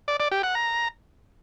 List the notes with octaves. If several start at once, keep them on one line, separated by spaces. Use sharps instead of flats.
D5
D5
G4
F#5
A#5